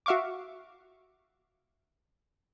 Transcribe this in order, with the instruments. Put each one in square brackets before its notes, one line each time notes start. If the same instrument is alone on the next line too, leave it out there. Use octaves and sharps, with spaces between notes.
[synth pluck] F#4 E5 F5 C#6 D6